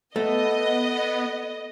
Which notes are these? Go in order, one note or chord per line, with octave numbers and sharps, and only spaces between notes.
A3 B3 D#5